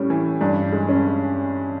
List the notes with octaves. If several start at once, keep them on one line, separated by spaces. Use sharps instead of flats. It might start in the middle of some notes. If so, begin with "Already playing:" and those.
Already playing: A2 G3 C#4
E3
G2 D4
G#3
C#4